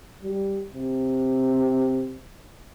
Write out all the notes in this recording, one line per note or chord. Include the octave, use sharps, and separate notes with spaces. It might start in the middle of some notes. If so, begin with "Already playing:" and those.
G3
C3